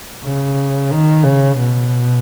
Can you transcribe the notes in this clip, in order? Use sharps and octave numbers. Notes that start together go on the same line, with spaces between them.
C#3
D#3
C#3
B2